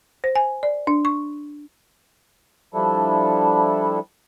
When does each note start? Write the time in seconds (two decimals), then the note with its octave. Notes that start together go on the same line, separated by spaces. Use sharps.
0.24 C5
0.35 G#5
0.63 D5
0.87 D4
1.05 C#6
2.74 F3 G3 D4 E4 A4